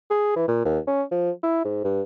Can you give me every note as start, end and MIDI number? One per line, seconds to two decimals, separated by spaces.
0.10 0.36 68
0.36 0.46 52
0.48 0.61 46
0.65 0.79 39
0.87 1.03 61
1.11 1.31 53
1.43 1.64 64
1.65 1.80 44
1.84 2.02 43